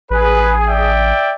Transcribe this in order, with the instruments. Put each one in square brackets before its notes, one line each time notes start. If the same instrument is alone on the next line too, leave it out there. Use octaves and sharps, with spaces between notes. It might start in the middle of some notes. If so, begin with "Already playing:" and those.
[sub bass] A1 [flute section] G#4 [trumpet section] B4
[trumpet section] D5 E5 G5